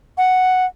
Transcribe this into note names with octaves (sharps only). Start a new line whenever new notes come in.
F#5